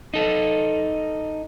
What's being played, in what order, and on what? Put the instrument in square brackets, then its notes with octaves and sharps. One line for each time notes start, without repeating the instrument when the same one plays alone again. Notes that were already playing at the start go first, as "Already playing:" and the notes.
[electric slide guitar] D#4 A4